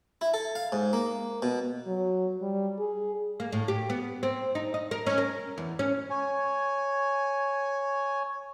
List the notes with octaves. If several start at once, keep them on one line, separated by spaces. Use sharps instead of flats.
E4
A4
F5
G#2
A#3
B2
F#3
G3
G#4
A#3
A2
G4
B3
C4
D#4
D#5
A#4
C#4
A#4
E2
C#4
C#5 G#5